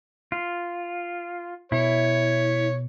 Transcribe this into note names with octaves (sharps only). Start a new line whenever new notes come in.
F4
B2 E4 C#5